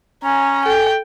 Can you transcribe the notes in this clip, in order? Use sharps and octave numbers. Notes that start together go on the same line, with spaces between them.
C#4 G#5 A#5
A4 G5